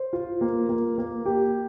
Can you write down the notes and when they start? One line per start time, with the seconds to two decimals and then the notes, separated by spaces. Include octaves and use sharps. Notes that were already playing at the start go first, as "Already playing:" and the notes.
Already playing: C5
0.13 F4
0.41 A#3
0.69 A#3
0.98 A#3
1.26 G4